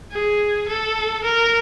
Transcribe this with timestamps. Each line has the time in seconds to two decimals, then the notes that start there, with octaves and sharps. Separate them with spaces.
0.12 G#4
0.68 A4
1.24 A#4